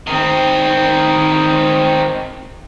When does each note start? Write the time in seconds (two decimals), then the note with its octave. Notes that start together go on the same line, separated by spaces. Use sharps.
0.07 D#3 C4